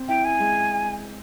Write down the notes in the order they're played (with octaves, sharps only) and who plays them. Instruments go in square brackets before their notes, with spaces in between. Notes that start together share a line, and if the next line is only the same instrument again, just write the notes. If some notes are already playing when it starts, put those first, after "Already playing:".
Already playing: [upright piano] C4
[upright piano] E4 [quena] G5
[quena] G#5
[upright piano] G#3